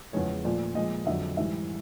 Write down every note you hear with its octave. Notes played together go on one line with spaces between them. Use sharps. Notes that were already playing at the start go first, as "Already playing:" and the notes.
E2 C#3 F3 G#3 C#5
A#2 F3 A3 D5
A#2 F3 G#3 D#5
F2 D3 F#3 E5
G#2 E3 G3 E5